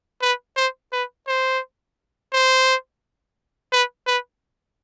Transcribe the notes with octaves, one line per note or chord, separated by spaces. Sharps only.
B4
C5
B4
C5
C5
B4
B4